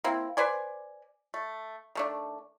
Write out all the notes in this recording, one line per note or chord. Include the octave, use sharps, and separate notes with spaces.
A#3 C4 E4
B4 C5 D5 G#5
A3
D#3 A3 D4